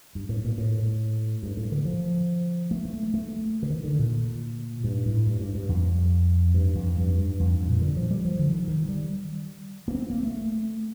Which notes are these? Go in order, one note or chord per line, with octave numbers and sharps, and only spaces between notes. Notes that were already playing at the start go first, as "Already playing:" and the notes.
G2
A2
A#2
A2
G2
A2
D3
F3
A3
A3
A3
D3
D#3
D3
A#2
G2
A2
G2
G2
G2
F2
G2
F2
G2
G2
F2
G2
A#2
D3
F3
G3
F3
D3
D#3
D#3
G3
A#3
C4
A#3
A3